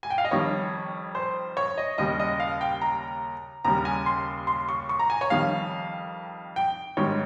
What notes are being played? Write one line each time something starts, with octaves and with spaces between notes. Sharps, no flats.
G#5
G5
F5
D#5
F2 D#3 G3 C#5
C5
C#5
D#5
D#2 C#3 G3 D#5
D#5
F5
G5
A#5
D#2 C#3 G3 A#5
G#5
C6
C6
C#6
C#6
A#5
G#5
C#5
F2 D#3 G3 F5
G5
G#2 D#3 G3 C#5